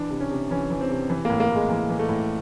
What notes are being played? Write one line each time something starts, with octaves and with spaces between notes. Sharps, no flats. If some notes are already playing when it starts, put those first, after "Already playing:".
Already playing: E3 D4
C3
C#4
C3
E3 C#4
E3
C4
C3
E3
A2 A#3
A#3
A2 G#3
E3 A#3
E3
A3
A2